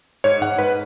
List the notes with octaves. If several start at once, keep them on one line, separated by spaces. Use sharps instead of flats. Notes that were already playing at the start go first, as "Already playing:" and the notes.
G#2 C#5
G#2 F#5
G#2 B4